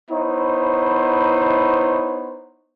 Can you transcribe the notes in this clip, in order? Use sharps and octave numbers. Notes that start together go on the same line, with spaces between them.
B3 D#4 E4 C5 C#5